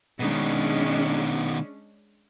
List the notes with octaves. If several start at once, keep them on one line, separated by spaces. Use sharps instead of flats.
B2 D#3 G#3 C#4 D4